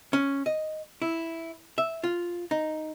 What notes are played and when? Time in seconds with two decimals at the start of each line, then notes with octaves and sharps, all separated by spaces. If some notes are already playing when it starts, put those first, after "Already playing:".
0.13 C#4
0.46 D#5
1.02 E4
1.78 E5
2.04 F4
2.51 D#4